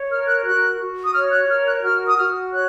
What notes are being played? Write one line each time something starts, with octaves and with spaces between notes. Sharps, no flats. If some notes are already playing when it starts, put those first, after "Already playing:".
Already playing: C#5
A#4 F6
F#6
F#4 F#6
F#4
D#6
C#5 F6
F#6
A#4 F6
F#6
F#4 F6
D#6
F#4 F6
C#5 F#6